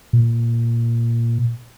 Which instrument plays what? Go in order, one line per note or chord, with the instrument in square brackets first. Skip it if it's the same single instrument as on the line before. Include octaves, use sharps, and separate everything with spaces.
[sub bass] A#2